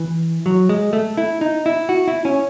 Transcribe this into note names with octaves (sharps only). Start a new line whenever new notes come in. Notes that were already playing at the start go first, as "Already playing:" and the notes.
Already playing: E3
F#3
G#3
A3
E4
D#4
E4
F#4
E4
C#4